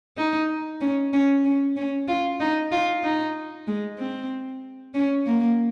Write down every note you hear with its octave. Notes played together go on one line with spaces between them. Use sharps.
D#4
C#4
C#4
C#4
C#4
F4
D#4
F4
D#4
G#3
C4
C#4
A#3